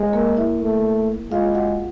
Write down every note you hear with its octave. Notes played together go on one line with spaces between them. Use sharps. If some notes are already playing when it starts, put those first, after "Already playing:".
Already playing: G#3
A#3 A#4
E4 E5
A3
G#3 F4 F5
F#4 F#5